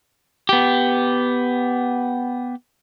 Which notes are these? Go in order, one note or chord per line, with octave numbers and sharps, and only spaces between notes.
B3 G4